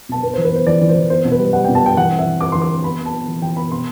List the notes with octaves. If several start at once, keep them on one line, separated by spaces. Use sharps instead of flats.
B2 A5
B3 B4
C5
E3
B4
B3 C5
E3 D5
E3
C5
E3
B3 C5
B2
B4
G3
G3 F#5
G5
B2
A5
G3 G5
E3 F#5
C4
E5
E3
C4 D6
E3 C6
D6
C4
B3 B5
B3
A5
B3
E3
E3 G5
B3 B5
B2 C6